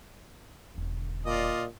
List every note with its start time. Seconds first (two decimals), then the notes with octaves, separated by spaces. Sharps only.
0.75 E1 D3
1.25 A#2 F4 D5 D#5